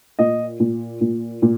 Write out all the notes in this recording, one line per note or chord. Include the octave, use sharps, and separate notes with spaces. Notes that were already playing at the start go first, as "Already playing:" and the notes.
A#2 D#5
A#2
A#2
A#2